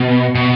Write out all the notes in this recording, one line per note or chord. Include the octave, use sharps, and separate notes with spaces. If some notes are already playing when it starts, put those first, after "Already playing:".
Already playing: B2
B2